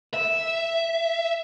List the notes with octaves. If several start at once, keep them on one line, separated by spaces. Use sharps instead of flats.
E5